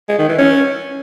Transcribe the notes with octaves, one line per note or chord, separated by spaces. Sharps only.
G#3
D#3
E3
C#4